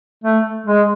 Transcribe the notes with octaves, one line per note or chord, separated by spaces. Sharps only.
A3
G#3